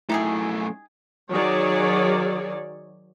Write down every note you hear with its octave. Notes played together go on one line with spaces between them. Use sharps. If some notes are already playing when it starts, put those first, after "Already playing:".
F#2 A3 D#4 E4 G4 G#4
D#3 F#3 G#4 C#5 D5